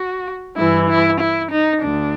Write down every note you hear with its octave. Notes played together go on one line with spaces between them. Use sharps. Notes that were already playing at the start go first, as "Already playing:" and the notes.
Already playing: F#4
G2 E3 E4
E4
E4
D#4
D2 D4